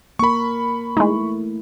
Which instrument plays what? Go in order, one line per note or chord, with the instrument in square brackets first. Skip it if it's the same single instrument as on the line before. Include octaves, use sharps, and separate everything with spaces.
[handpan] A#3 A#4 [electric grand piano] B5 C#6
[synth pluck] G#3 D#4 [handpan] A3 E4